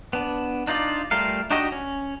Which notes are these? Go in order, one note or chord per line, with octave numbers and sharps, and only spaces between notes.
B3 D4
D4 D#4 F4 D5
G3 A3 F4 A#4 F5
D4 D#4 F#4 G4 D#5
C#4